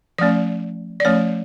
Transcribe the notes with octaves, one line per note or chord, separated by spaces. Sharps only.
F3 A3 C#4 D5
D5
F3 A3 C#4 C#5